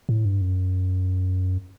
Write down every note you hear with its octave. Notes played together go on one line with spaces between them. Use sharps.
A2
G2
F#2